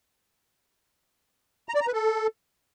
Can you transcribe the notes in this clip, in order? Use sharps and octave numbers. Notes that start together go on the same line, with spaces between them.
A#5
D5
A#5
B4
A4